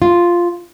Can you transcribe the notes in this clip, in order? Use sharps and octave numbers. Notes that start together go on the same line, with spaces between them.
F4